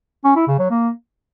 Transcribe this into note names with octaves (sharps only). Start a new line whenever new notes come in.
C#4
E4
C#3
F#3
A#3